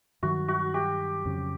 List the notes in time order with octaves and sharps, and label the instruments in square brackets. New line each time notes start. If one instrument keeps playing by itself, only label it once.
[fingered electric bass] G2 D#3 F#3 [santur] F#4
[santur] F#4
G4
[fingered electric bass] F2 C#3 F#3